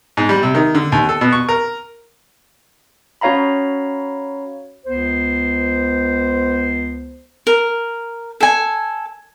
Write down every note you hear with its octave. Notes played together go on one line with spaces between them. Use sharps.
G#2
G3
C3
D#3
D3
D#2
A4
B2
C#6
A#4
C#4 F#4 C#5 F5 A#5 B5
C#2 B3 C5
A#4
A4 G#5